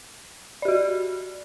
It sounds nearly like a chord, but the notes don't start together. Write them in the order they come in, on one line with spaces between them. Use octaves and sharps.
D5 G4 F#4